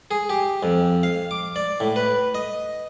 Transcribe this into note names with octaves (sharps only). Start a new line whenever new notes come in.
G#4
G4
F2
F5
D6
D5
A2
B4
D#5